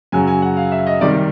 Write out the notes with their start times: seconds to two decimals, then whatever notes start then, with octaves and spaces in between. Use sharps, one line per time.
0.12 F#2 C#3 F#3 G#5
0.27 G#5
0.42 F#5
0.57 F5
0.72 E5
0.86 D#5
1.01 C3 D#3 G3 D5